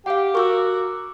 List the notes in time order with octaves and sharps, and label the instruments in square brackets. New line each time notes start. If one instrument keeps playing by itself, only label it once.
[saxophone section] G4 [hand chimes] F5 F#5
[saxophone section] F#4 A#4 [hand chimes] C#6 D6 E6